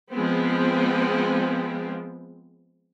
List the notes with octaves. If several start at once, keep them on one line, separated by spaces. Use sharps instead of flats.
F3 G#3 B3 C4